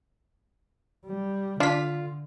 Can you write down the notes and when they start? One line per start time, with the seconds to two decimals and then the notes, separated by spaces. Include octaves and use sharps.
1.06 G3
1.60 D3 D4 F4 B6